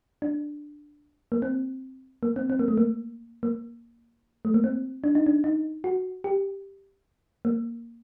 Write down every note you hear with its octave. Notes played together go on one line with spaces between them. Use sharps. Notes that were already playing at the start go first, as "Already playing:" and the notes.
D4
A#3
C4
A#3
C4
C4
A#3
A3
A#3
A#3
A3
A#3
C4
D4
D#4
D4
D#4
F#4
G4
A#3